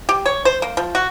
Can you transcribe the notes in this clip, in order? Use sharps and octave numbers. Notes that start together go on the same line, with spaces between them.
G4
C#5
C5
A#3
F3
F#4